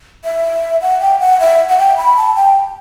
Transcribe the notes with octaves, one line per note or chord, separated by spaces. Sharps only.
E5
F#5
G5
F#5
E5
F#5
G5
B5
A5
G5